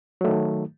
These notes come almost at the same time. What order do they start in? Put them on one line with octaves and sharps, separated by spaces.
F#3 A3 D#3